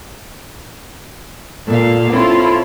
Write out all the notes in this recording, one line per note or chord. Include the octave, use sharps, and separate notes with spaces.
A#2 A4 F5
C4 C#4 E4 F4 A4